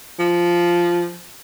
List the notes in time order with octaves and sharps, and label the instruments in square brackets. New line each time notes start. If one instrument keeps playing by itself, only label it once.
[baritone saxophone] F3